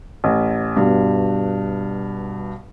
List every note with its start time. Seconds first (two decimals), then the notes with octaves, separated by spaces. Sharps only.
0.24 A1
0.77 G2 B2